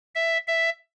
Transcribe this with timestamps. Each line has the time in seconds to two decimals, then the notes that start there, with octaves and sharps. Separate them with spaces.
0.15 E5
0.47 E5